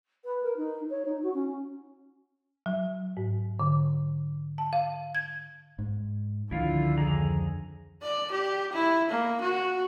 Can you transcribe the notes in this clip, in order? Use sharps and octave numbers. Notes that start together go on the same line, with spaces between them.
B4
A#4
D#4
C#5
D#4
F#4
C#4
F#3
G#2
D3
A5
F5
G#6
G#2
C#2 D3 D#3 F3 E4 F4 F5
F2 G#4 A#5
D5
G4
E4
A#3
F#4